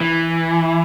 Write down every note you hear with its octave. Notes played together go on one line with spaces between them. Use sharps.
E3